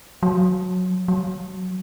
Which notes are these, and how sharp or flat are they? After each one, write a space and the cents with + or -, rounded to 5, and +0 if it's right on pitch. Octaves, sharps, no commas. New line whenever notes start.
F#3 -10
F#3 +5